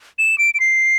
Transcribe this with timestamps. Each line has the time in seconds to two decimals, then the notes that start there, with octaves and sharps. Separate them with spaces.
0.19 E7
0.38 D7
0.54 D7
0.60 C7